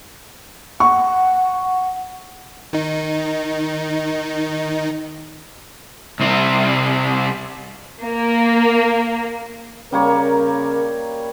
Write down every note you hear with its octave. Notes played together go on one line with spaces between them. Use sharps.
F#5 C#6
D#3 D#4
C2 C4
A#3
C#3 G3 A#3 A#4 C#5